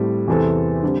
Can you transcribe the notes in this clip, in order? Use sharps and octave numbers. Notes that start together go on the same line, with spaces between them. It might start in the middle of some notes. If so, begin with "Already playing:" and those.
Already playing: A2 G3 C4
E2 C3 E3 C4 A4
D3 G3 C4